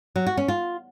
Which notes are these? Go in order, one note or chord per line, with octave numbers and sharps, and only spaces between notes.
F#3
F#4
C#4
F4